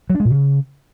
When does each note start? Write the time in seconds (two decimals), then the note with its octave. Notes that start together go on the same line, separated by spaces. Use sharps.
0.10 F#3
0.15 D4
0.20 G#3
0.25 A#2
0.30 C#3